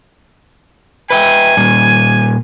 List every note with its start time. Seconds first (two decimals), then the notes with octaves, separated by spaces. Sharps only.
1.10 B4 E5 G5 G#5
1.57 A#2 G3